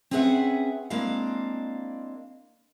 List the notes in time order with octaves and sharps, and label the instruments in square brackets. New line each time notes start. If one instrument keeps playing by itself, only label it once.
[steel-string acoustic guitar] C4 C#4 G#4 B4 E5 F#5
G#3 A#3 C4 D4 E4 F5